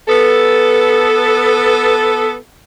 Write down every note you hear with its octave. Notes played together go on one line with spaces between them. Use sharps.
B3 A4